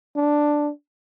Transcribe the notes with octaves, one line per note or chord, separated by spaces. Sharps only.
D4